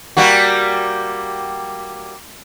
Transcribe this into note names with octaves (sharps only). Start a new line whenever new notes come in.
G3 A#3 F#4